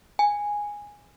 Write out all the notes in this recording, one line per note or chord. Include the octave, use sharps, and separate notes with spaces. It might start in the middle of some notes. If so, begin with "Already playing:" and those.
G#5